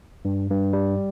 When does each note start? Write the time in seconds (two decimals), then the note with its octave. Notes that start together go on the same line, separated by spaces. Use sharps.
0.25 G2
0.50 G2
0.73 G3